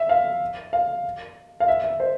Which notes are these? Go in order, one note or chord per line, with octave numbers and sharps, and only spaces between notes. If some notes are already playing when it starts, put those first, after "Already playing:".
Already playing: E5
F5
F5
F5
E5
E5
C5